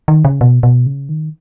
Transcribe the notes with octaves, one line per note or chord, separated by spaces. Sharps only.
D#3
C#3
B2
B2
C#3
D#3